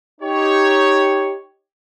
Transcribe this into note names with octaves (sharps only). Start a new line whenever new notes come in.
D#4 G4 C#5